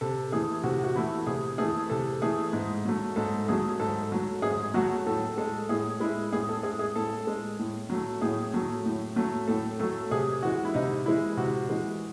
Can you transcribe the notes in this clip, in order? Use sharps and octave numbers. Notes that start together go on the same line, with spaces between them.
C3 A4
E3 A3 G#4
C3 F#4
F#4
E3 A3 E4
C3 G#4
E3 A3 G#4
C3 A4
E3 A3 G#4
G#2
F#3 A3
G#2 A4
F#3 A3 G#4
G#2 A4
F#3 A3
G#2 G#4
F#3 A3 F#4
A2 A4
G#3 A4
A2 G#4
G#3 E4
A2 G#4
A4
G#3 G#4
G#4
A2 A4
G#3
A2
F#3 A3
A2 G#4
F#3 A3
A2
F#3 A3
A2 A4
F#3 A3 A4
C3 G#4
E3 G#3 F#4
E4
C3 D#4
E3 G#3 E4
C3 F#4
E3 G#3